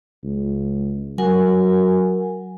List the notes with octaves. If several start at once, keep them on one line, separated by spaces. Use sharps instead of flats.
C#2
F#3 A#4 F#5 G#5